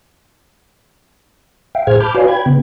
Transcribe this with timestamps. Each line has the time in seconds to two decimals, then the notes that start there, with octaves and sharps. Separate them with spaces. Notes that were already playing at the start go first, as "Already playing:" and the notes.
1.75 E5 F5 G5
1.87 A2 G#4 C5 F6 G#6
2.00 A5 B5 D6 F6 G6
2.15 F#4 B4 C#5 D5 F5 G#5
2.28 G5 B5 G#6
2.46 C#3 B3